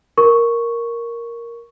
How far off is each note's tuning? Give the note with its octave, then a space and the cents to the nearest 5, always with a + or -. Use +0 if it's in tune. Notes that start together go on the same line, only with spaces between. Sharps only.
A#4 +0 C#6 +0